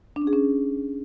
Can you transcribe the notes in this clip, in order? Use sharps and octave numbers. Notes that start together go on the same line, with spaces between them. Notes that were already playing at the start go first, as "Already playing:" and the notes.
D4
C#4
G#4
C#4